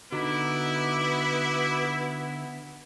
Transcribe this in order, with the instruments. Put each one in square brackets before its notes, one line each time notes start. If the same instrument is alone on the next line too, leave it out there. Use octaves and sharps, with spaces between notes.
[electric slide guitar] D3 D#4 [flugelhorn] B3 [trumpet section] E4 [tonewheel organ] F#4 D6